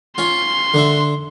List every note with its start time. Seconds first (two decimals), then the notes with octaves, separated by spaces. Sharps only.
0.18 C#4 F4 C6
0.74 D3 D4 E5